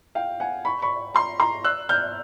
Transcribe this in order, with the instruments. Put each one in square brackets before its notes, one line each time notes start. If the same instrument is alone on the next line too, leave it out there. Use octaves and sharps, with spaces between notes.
[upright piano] F5 G5
F#5 G#5
B5 C#6
B5 C#6
A#5 C6
A#5 C6
E6 F#6
F6 G6